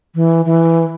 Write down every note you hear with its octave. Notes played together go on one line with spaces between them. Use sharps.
E3
E3